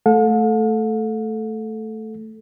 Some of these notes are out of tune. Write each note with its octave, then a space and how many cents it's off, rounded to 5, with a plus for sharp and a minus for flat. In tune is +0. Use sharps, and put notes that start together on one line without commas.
A3 +0 A4 -10 F5 +45